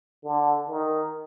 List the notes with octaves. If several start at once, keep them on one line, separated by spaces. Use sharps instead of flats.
D3
D#3